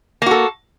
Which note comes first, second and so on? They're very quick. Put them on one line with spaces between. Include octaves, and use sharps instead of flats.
A#3 F#4 A4